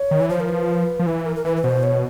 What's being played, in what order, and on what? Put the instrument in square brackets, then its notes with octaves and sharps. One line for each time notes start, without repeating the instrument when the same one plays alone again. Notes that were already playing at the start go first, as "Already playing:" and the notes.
Already playing: [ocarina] C#5
[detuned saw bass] D#3
E3
[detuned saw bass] F3 [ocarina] C5
[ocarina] A#4
B4
[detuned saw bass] F3
[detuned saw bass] E3 [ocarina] B4
[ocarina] A#4
A#4
[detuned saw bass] E3 [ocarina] B4
[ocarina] B4
[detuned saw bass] B2 [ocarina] C5
[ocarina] C#5